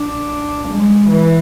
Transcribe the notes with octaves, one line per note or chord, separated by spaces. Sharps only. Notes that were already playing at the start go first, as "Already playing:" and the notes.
Already playing: D4
G#3
E3